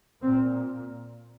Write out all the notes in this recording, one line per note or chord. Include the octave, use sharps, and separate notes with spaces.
A#2 C4